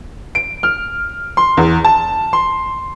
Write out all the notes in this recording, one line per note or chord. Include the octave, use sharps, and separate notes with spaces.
D7
F6
C6
E2
A5
C6